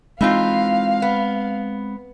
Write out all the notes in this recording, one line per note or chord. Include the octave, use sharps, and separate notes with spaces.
E3 G#3 C4 D#4 F4 F5
B3